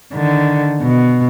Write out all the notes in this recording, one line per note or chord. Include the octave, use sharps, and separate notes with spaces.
D3 D#3
B2